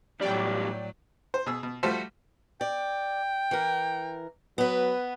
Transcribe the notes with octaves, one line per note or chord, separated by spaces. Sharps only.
E2 A2 F#3 G3 D5 G5
C5
B2 G#4 E6
B2
F3 G3 A3 F#4 A4 C5
D5 G5
E3 A#4
F#3 B3 B4